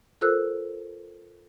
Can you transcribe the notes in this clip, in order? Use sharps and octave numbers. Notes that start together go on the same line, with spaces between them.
F4 A4 A#4 C5 E6 F#6